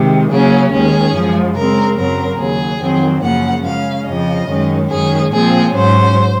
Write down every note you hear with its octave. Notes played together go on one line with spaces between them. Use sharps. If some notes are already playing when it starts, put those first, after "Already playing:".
Already playing: C3 D#3 G#3
C#3 F#3 A#3 C#4 G#4
D#2 D#3 G#3 C#4 G#4
F#2 F3 G#3
C#3 G#3 C4 A#4
F#2 C#3 F#3 C4 A#4
D#2 C#3 F#3 G#4
F2 D#3 F#3 C4
F#2 C#3 F3 A#3 C#4 F#5
C#3 G#3 C#4 F5
F2 C#3 F3 D#5
F#2 D#3 G#3 C#4
F#2 D#3 G#3 C#4 G#4
A#2 F3 C4 G#4
G#2 F#3 C#4 C5